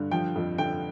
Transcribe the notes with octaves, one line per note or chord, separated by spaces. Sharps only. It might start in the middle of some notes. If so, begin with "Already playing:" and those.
Already playing: G2 D3
F3 G5
F2
D3 G5